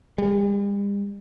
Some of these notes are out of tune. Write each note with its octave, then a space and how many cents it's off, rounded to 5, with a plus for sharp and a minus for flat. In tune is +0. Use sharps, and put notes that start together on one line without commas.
G3 +45